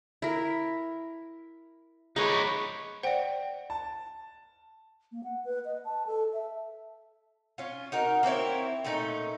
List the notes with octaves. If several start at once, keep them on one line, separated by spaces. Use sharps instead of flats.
E4 A#4
G#3 D#4 B4 C#5
C5 D5 F#5 G5
A5
A#3
F#5
B4
D#5
A5
A4
E5
C#4 F4
D#4 F#4 A#4
A#3 C4 E4 C#5
A#2 A3 C#4 D#4